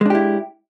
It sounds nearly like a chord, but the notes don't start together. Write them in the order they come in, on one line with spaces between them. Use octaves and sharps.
G#3 D4 G4 E4